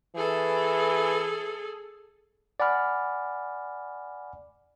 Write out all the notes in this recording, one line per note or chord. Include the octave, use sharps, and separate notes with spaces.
E3 G#4 A4
D5 F#5 G#5 B5 F6